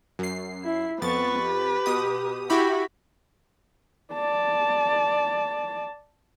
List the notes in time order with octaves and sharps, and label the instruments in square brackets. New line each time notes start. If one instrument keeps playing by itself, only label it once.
[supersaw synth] F#2 C7
[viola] E4
[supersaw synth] F2 A6 [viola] B3 C#6 [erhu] B4
[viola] G4
[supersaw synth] B2 D#6
[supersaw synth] E4 G4 B5 [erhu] F#4
[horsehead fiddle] D5 A5